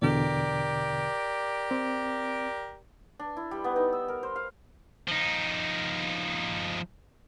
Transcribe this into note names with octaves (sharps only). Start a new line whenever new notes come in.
E2 B2 D3 G4 A#4 D5
C4
D4
E4
G3
B3
D#4
E6
A#4
C5
F5
F3 D#4